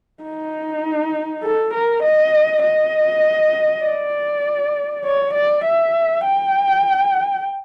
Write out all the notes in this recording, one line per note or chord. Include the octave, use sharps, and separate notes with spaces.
D#4
A4
A#4
D#5
D#5
D5
C#5
D5
E5
G5